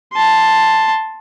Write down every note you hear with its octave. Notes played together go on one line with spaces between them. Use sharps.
A5 C6